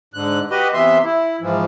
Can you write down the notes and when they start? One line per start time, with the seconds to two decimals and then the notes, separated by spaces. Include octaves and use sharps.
0.14 G#2 D3 F#6
0.51 F#4 G4 B4 D#5
0.74 C3 E3 B3 E5 C6
1.04 E4
1.41 G#2 E3 F3